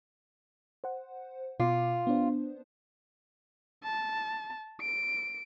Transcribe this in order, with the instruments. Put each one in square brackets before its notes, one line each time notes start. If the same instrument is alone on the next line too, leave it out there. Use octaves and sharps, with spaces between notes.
[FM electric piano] C5 F#5
[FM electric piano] B2 C6 D6 [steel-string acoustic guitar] F4
[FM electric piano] B3 D4 C5
[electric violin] A5
D7